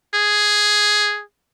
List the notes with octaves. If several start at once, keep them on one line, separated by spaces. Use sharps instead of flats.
G#4